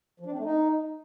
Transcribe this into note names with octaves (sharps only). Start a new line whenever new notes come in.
F3
D4
C4
A3
D#4